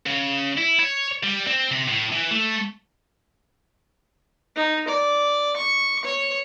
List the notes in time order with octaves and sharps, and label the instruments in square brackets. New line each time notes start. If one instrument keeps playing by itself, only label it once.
[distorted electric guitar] C#3
E4
C#5
G3
C4
C3
A2
E3
A3
[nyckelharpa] D#4
D5
C#6
C#5